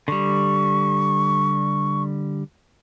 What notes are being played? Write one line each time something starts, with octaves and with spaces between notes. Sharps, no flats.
D3 G3 C#6